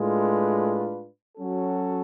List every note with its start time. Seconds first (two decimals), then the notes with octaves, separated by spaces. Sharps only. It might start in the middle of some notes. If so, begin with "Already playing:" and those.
Already playing: A2 G#3 D4 F4 B4
1.37 F#3 C#4 F#4 A4